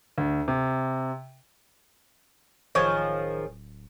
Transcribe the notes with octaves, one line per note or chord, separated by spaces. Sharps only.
D2
C3
D1 D#3 F3 G#4 C#5